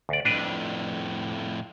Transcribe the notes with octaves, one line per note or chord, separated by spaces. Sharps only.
D2 D5
F2 A2 D4 B4 D5